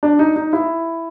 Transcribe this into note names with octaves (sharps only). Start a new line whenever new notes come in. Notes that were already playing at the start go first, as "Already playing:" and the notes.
D4
D#4
D#4
E4